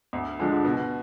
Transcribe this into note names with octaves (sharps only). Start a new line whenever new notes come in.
D2
D3 F3 G#3 D4
B2